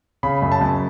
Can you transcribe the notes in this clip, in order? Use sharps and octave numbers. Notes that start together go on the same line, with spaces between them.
C#3 B5
F#2
A5
F#2